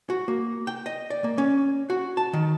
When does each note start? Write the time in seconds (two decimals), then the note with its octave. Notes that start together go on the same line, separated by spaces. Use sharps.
0.10 F#4
0.28 A#3
0.67 G5
0.86 D#5
1.10 D5
1.24 A#3
1.38 C#4
1.90 F#4
2.17 A5
2.33 D#3